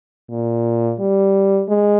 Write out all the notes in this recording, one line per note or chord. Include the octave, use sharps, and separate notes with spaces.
A#2
G3
G#3